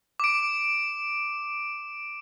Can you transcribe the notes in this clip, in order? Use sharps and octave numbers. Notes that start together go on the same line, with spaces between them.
D6 D7